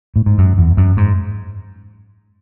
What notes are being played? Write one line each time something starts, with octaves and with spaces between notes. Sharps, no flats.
A2
G#2
F#2
E2
F#2
G#2